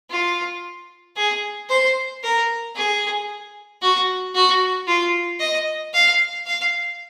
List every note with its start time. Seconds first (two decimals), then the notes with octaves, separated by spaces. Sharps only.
0.11 F4
1.16 G#4
1.70 C5
2.23 A#4
2.76 G#4
3.82 F#4
4.35 F#4
4.87 F4
5.40 D#5
5.93 F5
6.46 F5